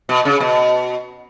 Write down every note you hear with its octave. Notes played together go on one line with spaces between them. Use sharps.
B2
C#3
B2